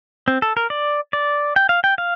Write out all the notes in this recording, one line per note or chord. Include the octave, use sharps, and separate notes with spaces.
C4
A4
A#4
D5
D5
G5
F5
G5
F5